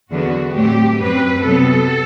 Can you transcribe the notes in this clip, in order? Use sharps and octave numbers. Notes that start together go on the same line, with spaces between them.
E2 D3 F#3 B3 D4 F#4
A2 F#3 A3 C4 G4
F#2 F#3 C4 B4
C3 F#3 B3 A4